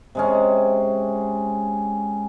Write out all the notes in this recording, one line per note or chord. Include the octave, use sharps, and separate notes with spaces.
C3 G#3 C#4